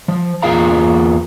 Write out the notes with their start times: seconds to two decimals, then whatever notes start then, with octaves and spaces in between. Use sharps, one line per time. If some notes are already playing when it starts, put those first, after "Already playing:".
0.08 F3
0.42 E2 A#3 F4 G#4 F5 A#5